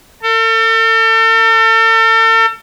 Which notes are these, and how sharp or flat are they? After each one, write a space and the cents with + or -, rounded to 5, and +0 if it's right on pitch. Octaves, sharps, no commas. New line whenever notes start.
A4 +40